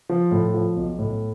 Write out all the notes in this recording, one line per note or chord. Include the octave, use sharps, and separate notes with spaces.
F3
A2
F3
B1
A2